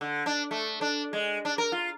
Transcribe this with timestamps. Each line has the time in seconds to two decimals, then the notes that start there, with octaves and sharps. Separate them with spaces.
0.01 D3
0.26 D4
0.51 A3
0.81 D4
1.13 G#3
1.45 D4
1.58 A#4
1.72 F4